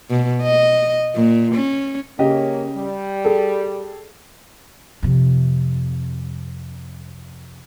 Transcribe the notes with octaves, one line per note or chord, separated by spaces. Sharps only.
B2
D#5
A#2
C#4
C#3 A#3 C#4 G4 D#5
G3
G#4 A4
F2 C3